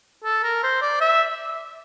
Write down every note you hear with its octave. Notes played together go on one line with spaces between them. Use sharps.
A4
A#4
C5
D5
E5